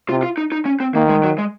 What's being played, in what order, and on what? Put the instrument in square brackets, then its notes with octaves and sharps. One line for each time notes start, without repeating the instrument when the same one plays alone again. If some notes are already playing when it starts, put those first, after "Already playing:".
[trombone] C3 [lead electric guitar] F4
[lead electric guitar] F4
D#4
D#4
C#4
C4
[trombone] D#3 [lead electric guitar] A#3
[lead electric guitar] G#3
F#3
G#3